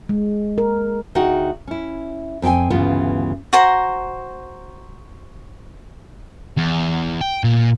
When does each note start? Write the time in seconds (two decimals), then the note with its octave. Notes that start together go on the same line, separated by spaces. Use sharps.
0.09 G#3
0.58 A#4
1.15 D2 D#4 F#4 G#4 F#5 G5
1.67 C#4 E4
2.42 F2 C4 G#4 G5 G#5
2.70 D2 G2 C#3 E3 B3 F4
3.53 F#4 C5 A#5
6.57 E2
7.21 G5
7.44 A#2